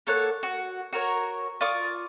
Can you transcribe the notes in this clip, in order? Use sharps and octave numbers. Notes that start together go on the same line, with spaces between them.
A#3 A4 C#5 F#5
F#4
F#4 A#4 C#5
F4 D5 C#6 D#6